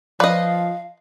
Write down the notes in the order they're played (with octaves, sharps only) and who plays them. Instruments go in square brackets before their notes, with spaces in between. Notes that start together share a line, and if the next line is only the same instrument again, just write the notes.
[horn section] F3 [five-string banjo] B4 D#5 [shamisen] D5 [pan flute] F5